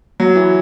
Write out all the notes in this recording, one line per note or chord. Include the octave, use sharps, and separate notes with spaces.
F#3
E3